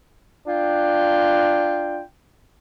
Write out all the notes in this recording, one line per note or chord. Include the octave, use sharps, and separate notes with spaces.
D4 F4 G5